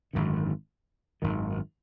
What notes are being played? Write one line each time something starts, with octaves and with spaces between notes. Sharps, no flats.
G#1 F#2 D3
G#1 F#2 D#3